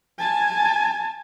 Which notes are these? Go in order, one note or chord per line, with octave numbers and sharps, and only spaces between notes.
G#5 A5